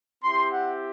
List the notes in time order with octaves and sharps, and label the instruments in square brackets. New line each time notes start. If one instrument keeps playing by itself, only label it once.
[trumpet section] C4 E4 G4 C6
F#5